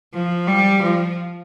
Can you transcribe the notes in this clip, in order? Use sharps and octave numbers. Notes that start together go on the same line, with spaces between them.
F3
G3
F3